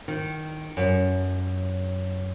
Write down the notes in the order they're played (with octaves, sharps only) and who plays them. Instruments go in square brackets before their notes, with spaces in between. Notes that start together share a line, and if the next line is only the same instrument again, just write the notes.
[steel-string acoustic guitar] D#3
F#2